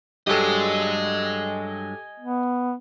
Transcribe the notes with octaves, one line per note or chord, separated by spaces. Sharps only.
G2 F#3 G#3 G4 A4 D#5 G#5
B3